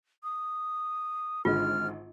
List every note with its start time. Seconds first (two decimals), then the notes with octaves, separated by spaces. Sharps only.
0.24 D#6
1.45 G#1 D3 G#3 F4 F6